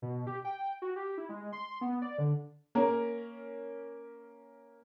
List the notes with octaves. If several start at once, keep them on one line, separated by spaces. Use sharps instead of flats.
B2
G4
G5
F#4
G4
E4
G#3
C6
B3
D5
D3
A#3 C#4 A#4